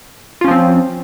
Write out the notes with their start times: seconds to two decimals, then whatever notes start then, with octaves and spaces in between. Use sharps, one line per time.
0.41 F4
0.44 C#4
0.48 F3
0.51 C4